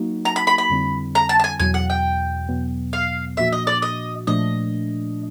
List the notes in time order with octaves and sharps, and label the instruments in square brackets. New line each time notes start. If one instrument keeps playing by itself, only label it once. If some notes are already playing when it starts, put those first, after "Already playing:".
Already playing: [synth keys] F#3 A#3 D#4 F#4
[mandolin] A#5
B5
B5
B5
[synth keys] F2 D3 G3 C4 E4
[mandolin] A#5
A5
A5
G#5
[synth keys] E2 B2 F#3 [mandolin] G#5
[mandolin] F#5
G5
[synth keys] E2 B2 F#3 B3
[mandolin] F5
[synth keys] A#2 F3 A#3 D4 F#4 [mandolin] E5
[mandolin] D#5
D5
D#5
[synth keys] A#2 F3 A3 D4 [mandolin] D#5